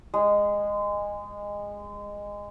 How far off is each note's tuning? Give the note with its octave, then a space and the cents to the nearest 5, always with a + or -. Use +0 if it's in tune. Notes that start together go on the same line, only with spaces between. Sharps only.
G#3 -20